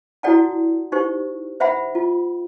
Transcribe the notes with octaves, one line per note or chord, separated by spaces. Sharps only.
E4 F#4 A4 D5 F#5 A5
D#4 G4 C5 C#6
C5 E5 F#5 B5
F4